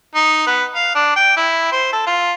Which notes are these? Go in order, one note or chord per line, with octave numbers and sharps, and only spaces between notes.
D#4
B3
F5
D4
G5
E4
C5
A4
F4